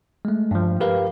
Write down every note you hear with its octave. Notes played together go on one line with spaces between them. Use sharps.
G#3 A3
G2 F3
G4 A#4 B4 F5